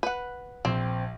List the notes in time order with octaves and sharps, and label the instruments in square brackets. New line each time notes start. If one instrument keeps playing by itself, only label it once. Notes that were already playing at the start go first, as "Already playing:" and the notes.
[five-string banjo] B4 F#5
[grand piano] A#1 [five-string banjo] C4